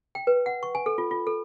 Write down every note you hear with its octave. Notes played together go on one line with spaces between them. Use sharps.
G5
B4
F#5
C#6
G#5
A4
F4
F4
A4